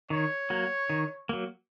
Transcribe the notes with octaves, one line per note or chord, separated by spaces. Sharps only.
D#3 C#5
F#3 A#3
D#3
F#3 A#3